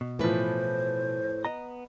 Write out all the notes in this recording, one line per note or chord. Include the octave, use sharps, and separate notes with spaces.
B2
A2 E3 F3 B4 C5
B3 D#5 A#5